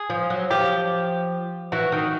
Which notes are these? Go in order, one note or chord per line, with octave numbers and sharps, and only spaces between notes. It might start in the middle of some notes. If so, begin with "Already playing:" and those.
Already playing: G#4
F3
F#3
F3 G4
E3 F#4
D#3